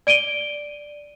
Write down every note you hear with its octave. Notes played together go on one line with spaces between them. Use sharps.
D5 D7 D#7 G7